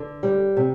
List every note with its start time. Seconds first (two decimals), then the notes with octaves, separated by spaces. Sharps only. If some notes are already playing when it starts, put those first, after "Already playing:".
Already playing: D3
0.23 G3
0.57 C3